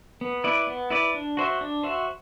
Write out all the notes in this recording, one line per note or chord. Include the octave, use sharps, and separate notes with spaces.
B3
E4 B4 D5
B3
E4 B4 D5
D4
F#4 C5 E5
D4
F#4 C5 E5